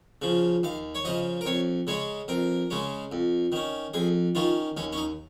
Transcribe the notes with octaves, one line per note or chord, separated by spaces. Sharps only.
C#3 F3
D#2 F5
C#5
C#3 F3 D#5
A#4
F2 C#5
C#3 G#3 C#4 C#5
F2 A#4
C#3 G#3 C#4
F2
D#3 C#4
F2 G#4
D#3 C#4 F4
D#2 C#4
C#4
D#4